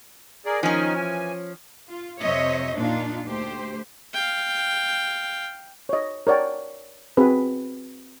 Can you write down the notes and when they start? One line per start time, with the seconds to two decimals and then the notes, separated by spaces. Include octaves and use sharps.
0.46 G#4 A#4 D5
0.63 D#3 F3 C#4 D#4 G#5
0.95 E3 G#5
1.89 F4
2.21 F2 C3 C5 C#5 D#5 E5
2.76 A#2 D4 D#4 F4
3.26 D2 A3 G4 C5
4.14 F5 G5
5.89 C#5 D#5
6.27 A#4 C#5 D5 F#5 G5
7.17 C4 F#4 G#4 B4